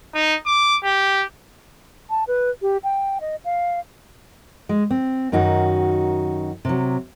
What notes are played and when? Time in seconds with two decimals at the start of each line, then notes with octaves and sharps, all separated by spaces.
0.15 D#4
0.46 D6
0.84 G4
2.10 A5
2.27 B4
2.62 G4
2.84 G5
3.21 D#5
3.45 F5
4.69 G#3
4.91 C4
5.32 F#2 D#3 D#4 F#4
6.65 C3 F#3